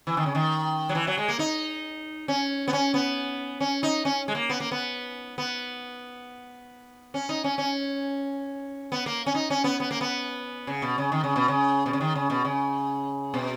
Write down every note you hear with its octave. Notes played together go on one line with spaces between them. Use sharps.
E3
D#3
C#3
D#3
F#3
E3
F#3
G#3
A#3
D#4
C#4
B3
C#4
B3
C#4
D#4
C#4
G#3
A#3
B3
A#3
B3
B3
C#4
D#4
C#4
C#4
B3
A#3
C#4
D#4
C#4
B3
B3
A#3
B3
C#3
B2
C#3
D#3
C#3
B2
C#3
B2
C#3
D#3
C#3
B2
C#3
B2